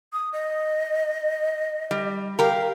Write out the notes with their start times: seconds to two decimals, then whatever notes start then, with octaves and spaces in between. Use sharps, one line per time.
0.13 D#6
0.33 D#5
1.91 G3
2.39 G4 A#4 F5